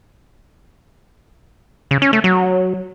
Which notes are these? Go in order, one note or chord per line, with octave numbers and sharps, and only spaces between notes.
C#3
C#4
A3
F#3